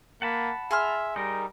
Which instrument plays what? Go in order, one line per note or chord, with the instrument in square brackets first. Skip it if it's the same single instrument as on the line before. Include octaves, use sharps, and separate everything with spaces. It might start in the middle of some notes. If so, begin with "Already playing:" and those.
[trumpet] A#3 [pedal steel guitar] F#5 A5 B5
[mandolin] G#4 C6 F6 [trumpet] E5
[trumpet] G3 [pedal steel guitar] D#4 A#4